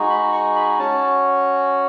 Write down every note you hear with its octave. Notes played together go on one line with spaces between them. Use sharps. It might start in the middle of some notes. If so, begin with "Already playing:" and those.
Already playing: G#3 D#4 F#4
B5
C#6
B5
C#4 F#4 A5